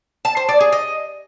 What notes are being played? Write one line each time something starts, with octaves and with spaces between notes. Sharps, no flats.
A5
C5
D5
G#4
D#5